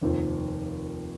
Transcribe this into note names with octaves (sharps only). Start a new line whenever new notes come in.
F1 D#2 D#3 C4 F4